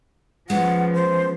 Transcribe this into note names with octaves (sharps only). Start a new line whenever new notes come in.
F3 G#3 B3 C#4 F#5
C5